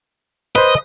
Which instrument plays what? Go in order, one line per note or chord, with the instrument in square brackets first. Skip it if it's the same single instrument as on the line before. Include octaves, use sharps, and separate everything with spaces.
[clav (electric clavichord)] B4 C5 [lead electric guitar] D#5